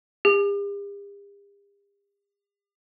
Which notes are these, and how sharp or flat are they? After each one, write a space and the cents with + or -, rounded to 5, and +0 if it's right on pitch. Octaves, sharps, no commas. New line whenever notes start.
G4 +45